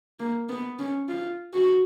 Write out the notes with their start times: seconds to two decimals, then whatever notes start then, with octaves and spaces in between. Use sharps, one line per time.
0.19 A#3
0.49 B3
0.79 C#4
1.08 F4
1.53 F#4